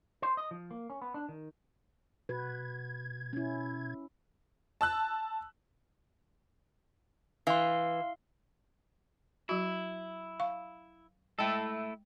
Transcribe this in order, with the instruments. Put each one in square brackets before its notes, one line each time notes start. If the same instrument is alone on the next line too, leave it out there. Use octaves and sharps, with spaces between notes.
[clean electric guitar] C5
D#5
F3
A#3
C#4
B3
D4
D#3
[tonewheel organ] B2 G#6 [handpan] F#4 B4
[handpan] C#4 E4
[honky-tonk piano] A5 E6 F#6
[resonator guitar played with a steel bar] E3 [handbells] F5 C6
[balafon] F#3 F#4 [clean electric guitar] E4
[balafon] F5 C#6
[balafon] G#3 G5 [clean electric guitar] A3 E4 A4